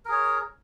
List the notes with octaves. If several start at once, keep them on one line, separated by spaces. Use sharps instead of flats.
G#4 A#4 C#5